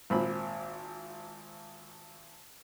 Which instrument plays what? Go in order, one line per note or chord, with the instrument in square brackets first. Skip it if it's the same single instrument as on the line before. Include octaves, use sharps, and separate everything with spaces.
[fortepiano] G#1 A#2 C4 B5